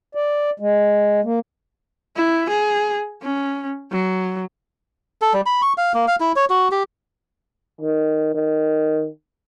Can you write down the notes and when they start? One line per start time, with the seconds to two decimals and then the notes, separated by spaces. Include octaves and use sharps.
0.15 D5
0.60 G#3
1.24 A#3
2.16 E4
2.50 G#4
3.22 C#4
3.92 F#3
5.21 A4
5.33 G3
5.46 B5
5.62 C#6
5.78 F5
5.94 A#3
6.08 F5
6.20 E4
6.36 C#5
6.50 F#4
6.71 G4
7.81 D#3
8.34 D#3